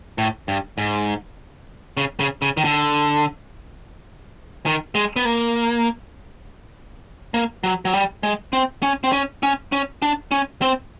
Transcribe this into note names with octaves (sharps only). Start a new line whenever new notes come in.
A2
G2
G#2
C#3
C#3
C#3
D#3
D3
D#3
G#3
B3
A#3
A#3
F#3
F#3
G3
G#3
C4
C#4
C4
C#4
C#4
C#4
D4
C#4
C4